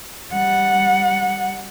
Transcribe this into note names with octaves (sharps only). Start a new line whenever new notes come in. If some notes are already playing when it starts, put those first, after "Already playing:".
G3 F#5